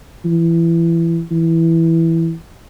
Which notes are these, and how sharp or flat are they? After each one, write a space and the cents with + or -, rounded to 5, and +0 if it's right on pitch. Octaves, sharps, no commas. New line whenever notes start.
E3 +20
E3 +0